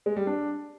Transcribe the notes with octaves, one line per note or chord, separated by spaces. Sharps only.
G#3
G3
D4